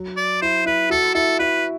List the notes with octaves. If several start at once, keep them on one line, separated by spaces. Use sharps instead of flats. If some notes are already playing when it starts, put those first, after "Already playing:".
Already playing: F#3
D5
E4 C5
E4 B4
F#4 A4
E4 A4
E4 B4